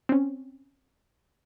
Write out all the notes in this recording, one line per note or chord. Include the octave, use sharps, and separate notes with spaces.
C4 C#4